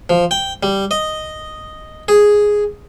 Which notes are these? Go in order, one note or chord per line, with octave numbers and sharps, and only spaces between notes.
F3
G5
G3
D#5
G#4